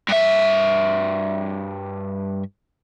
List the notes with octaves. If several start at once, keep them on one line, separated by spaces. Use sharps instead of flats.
G2 E5